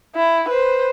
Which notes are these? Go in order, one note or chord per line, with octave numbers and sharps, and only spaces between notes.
E4
B4 C5